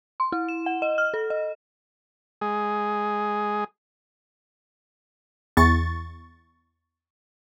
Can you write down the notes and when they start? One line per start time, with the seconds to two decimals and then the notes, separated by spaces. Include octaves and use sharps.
0.20 C6
0.32 E4
0.49 E7
0.66 F#5
0.82 D#5
0.98 F6
1.14 A4
1.30 D#5
2.41 G#3 G#4
5.57 E2 C#6 A6